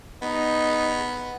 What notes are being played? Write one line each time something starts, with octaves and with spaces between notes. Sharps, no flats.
B3 D#4